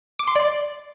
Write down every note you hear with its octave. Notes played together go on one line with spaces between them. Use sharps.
D6
C6
D5